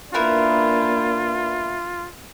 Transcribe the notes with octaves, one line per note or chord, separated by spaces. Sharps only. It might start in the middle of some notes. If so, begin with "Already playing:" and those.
A#3 B3 D4 E4 F4 A#4